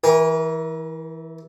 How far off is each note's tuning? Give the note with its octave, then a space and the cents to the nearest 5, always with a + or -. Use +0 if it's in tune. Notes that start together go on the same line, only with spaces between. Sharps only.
E3 -15 A#4 +30 G#5 -25